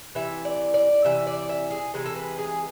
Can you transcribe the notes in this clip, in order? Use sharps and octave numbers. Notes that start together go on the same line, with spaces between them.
C3 E3 E5
D5
D5
C3 E3 E5
D5
E5
G#4
C3 E3 G#3
A4
B4
G#4